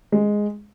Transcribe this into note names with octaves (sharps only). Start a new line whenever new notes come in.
G#3